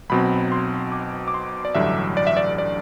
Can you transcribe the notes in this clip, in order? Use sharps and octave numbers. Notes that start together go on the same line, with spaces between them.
B1 B2 F#3 C4 B5
C6
D6
D6
C6
D5
A1 G2 D3 F#3 E5
D5
E5
D5
D5